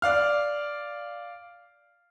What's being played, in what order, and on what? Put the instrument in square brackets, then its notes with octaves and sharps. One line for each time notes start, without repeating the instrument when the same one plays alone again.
[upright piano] D5 F5 F6